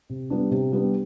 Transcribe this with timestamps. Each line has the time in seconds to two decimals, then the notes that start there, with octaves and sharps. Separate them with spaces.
0.09 C3
0.30 G3 B3 D4
0.51 C3
0.72 G3 B3 D4